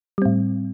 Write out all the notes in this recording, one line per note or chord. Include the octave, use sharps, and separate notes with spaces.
A2 G3 C4